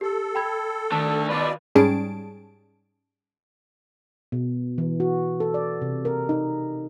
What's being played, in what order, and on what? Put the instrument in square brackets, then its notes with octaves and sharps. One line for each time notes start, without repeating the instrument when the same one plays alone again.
[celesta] G4 [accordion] A4
[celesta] G5 B5 G#6
[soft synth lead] D#3 [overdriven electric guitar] A3 D4 [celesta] A5
[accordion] B2 D5 [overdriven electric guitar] F4 B4
[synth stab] G#2 G3 C#4 G#4 A5 D7
[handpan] B2
E3
F#4
A4
D5
C3
A#4
D#4